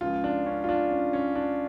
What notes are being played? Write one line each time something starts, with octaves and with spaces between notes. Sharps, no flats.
C#2 C#3 F3 F4
D4
C#4
F4
D4
C#4
C#4
D4